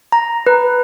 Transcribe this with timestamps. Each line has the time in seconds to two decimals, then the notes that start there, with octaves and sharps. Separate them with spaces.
0.12 A#5
0.47 B4